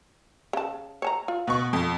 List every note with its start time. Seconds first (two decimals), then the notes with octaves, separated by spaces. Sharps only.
0.53 C#3 A5
1.02 C#5 A5 A#5
1.28 F4
1.47 B2 C#6
1.73 F2